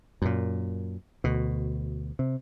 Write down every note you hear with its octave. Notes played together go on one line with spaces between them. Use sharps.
F#2 A#2
D2 B2
C3